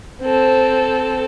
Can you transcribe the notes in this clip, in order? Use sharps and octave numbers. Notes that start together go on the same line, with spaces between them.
C4 A4